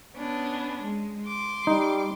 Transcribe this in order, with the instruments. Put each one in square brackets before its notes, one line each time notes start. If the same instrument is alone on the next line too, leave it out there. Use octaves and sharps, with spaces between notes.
[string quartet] B3 C#4 D4
G#3
C6 D6
[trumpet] G3 [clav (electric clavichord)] D#4